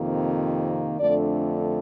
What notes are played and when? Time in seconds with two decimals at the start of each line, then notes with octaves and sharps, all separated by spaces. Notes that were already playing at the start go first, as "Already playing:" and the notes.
Already playing: F2 C3 D#3 A#3
0.99 F2 D3 A3 D4 D5